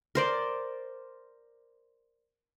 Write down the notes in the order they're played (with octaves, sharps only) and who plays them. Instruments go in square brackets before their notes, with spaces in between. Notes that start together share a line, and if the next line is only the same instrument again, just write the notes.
[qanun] A#4 C5 D5